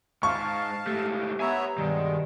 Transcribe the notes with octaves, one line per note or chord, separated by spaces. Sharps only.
G#2 F5 A5 C#6
G#2 A3 G4
B3 C#5 E5 G#5 A#5
G2 B2 D#3 G3 G#3